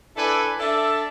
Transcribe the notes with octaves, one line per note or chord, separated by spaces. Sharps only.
D4 E4 A4 B4 D5 G#5
D4 A4 D5 E5